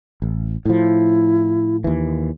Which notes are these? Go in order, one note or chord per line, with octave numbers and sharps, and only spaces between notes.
A1
A2 F3 E4
D#2 E3